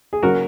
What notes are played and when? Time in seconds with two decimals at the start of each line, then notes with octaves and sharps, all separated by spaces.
0.13 G#4
0.23 C#3 F#3 F#4 A#4